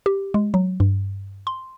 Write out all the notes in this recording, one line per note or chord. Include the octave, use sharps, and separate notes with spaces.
G4
G#3
F#3
G2
C6